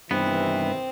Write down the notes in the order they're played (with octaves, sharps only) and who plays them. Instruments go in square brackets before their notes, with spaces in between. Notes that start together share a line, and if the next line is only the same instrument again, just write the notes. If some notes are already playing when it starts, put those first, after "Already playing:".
[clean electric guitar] G2 B3 [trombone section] C3 D#3 E3 [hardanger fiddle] C4